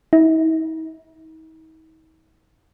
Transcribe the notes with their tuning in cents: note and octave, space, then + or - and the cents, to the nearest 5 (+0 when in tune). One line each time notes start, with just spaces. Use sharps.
D#4 +45